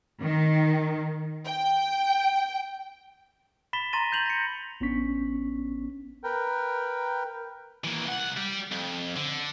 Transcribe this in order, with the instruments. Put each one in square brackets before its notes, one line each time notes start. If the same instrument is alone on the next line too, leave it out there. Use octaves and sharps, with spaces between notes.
[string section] D#3
G5
[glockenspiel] B5 A6 B6 E7 G7
A#5 C6 A6 A#6 D#7
C6 G6 C7 F7 F#7
A#6 C#7
[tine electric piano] A1 B3 C#4 D4 C#6 B6
[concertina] A#4 B4 G5
[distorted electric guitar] E3 A#3
C2 F#5
G3
F2
D3